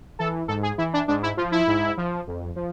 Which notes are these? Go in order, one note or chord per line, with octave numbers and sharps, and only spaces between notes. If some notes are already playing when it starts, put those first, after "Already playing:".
E3 A4
G#2 A4
G#4
E3 E4
D4
G#2 D4
E4
F3 F4
E4
G#2
F3
F2
F3